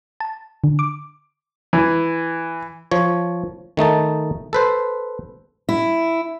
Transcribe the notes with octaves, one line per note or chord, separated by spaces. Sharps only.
A5
D3
D6
E3
F3 C#5
D#3 A3 D#4 A5
A4 B4 C5
E4